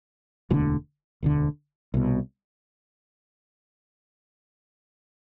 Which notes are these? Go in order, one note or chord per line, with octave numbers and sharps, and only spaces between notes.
E1 D2 D3 E3
E1 D2 D3
C2 B2